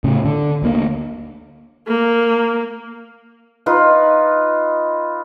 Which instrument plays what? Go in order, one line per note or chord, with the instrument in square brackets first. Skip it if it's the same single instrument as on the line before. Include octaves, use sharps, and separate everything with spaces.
[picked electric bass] A2 C#3
D3
D2 A#3
[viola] A#3
[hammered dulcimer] D#4 F4 B4